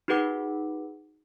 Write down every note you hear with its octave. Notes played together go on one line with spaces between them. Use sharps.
D#4 F#4 G#4 B4 F#5 D6